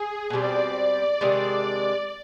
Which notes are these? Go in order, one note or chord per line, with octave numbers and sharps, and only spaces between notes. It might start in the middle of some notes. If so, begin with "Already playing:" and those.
Already playing: G#4
B2 G3 C4 D5
C3 D#3 G#3 D4